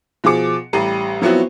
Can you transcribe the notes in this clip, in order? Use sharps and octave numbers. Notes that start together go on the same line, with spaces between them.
B2 F3 G#4 D6 C#7
A1 G3 A#5 C7 D#7
F3 F#3 B3 C4 E4 F#4